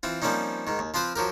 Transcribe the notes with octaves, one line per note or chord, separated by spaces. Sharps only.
E3 C4 F4
F3 G3 A#3 C4 C#4 D#4
G#2 D#3
D#2
F3 C4 F4 B4 C5
F3 F#3 G4 A#4